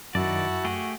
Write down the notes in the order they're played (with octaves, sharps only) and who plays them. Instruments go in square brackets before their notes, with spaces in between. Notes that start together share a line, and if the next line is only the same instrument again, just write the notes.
[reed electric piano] F#2 [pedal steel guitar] D#3 D5 [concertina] E4 A5 [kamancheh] F#4
[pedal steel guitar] A3 G4 G#4